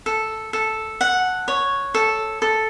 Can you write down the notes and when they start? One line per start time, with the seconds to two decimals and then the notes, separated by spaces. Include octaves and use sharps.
0.06 A4
0.53 A4
1.01 F#5
1.48 C#5
1.94 A4
2.42 A4